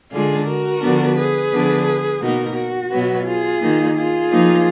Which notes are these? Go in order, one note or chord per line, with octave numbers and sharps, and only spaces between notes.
D3 G#3 D4 F4 G#4
F#4 A#4
D3 F3 B3 D4
G#4 B4
D3 F3 B3 D4
B2 A#3 D#4 F#4 A#4
F#4
B2 F#3 B3
F4 G#4
D#3 A#3 D#4
F4 G#4
F3 A#3 D#4